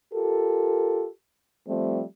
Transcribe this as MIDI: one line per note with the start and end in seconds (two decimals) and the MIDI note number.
0.13 1.07 65
0.13 1.07 67
0.13 1.07 69
0.13 1.07 70
1.68 2.03 53
1.68 2.03 55
1.68 2.03 57
1.68 2.03 60